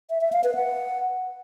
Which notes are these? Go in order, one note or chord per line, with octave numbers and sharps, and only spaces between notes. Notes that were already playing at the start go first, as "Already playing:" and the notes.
E5
E5
F5
B4
F#5